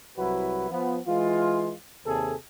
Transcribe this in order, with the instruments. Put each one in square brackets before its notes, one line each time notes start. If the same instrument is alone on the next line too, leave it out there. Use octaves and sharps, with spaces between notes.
[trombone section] C2 F#3 E4 F#4 B4
F3 B3
E3 G#3 F4
D#2 C3 G#4 A4